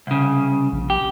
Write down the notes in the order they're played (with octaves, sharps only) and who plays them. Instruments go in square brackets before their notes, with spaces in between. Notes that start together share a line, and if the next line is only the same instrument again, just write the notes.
[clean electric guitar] C2 C#3
[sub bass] A#1
[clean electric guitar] G4